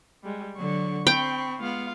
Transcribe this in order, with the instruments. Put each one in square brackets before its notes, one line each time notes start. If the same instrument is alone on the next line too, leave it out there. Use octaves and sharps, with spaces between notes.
[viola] G3 G#3
[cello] D3 F#3 [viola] C#6
[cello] C4 [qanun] G5 [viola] B5 C#6
[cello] G#3 B3 [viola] F4 F5